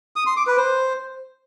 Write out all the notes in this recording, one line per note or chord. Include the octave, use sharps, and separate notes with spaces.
D#6
C6
D6
B4
C5